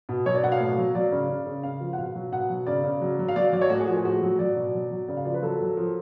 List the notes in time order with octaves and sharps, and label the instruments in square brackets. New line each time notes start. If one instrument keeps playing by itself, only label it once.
[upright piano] B2
F#3 C#5
D5
B2 F#5
F5
A2
F#3
F#3 D5
C#3
C#3
C#3
C#3 F5
F3
F#5
B2 F5
F#3
B2 F#5
F#3
C#3 D5
C#3
F#3
F#3
F5
F#3 D5
F5
F#3 D5
C#5
A2 F#4
G#4
F3 F#4
G#4
A2 F#4
F#3
F#3 D5
B2
F#3
F#3
C#3 D5
F5
F3 D5
B4
F#3 A4
F#3
F3